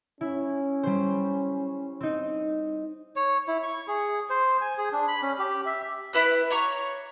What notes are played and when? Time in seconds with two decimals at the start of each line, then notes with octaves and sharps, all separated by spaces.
0.21 C#4 E4
0.83 G3 C5
2.01 C4 D#4
3.16 C#5
3.48 E4
3.63 C#6
3.88 G#4
4.30 C5
4.61 G#5
4.78 G#4
4.93 D4
5.08 B5
5.22 C#4
5.39 G4
5.66 E5
6.13 E4 B4 E6
6.50 C#5 A#5 C#6